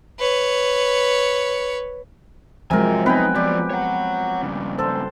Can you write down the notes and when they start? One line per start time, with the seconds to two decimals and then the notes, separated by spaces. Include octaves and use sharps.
0.19 B4 C#5
2.71 G#2 C3 F3 F#3 G#3 A#4 G#5
3.06 B3 C4 D#4 B4 G5 G#5
3.35 F3 G4 D5
3.71 C#5 F#5
4.42 G2 C#3
4.79 A4 C5